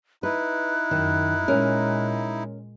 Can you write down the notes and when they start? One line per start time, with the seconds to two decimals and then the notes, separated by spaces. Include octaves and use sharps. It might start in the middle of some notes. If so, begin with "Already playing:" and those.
0.23 D#4 E4 B4 F#6
0.91 F#2 D#3
1.48 A#2 G#3 C#4 A#4